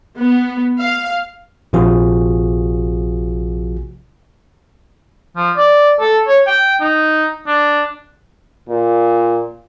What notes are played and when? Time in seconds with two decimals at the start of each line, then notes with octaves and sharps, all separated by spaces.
0.18 B3
0.77 F5
1.73 A#1 C3 F3 F4 F#4 G#4
5.37 F3
5.57 D5
6.01 A4
6.28 C#5
6.47 G5
6.81 D#4
7.47 D4
8.69 A#2